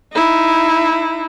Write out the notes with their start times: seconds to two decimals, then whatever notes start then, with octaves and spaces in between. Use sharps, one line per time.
0.13 D#4 E4